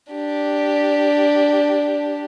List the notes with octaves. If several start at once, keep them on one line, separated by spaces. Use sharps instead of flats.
D4 G4